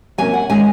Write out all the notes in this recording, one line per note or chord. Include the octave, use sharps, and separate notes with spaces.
C3 F#3 A#3 C#4 G#5
F#5
D#3 G#3 C#4 G#5